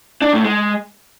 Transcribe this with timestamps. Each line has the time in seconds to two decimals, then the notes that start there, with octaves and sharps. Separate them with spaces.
0.22 D4
0.33 A2
0.44 G#3